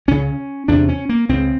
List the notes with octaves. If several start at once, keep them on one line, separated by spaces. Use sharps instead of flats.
C#2 C#3 C#4
E2 C3 D4
C#4
A#3
C#2 C#3 C4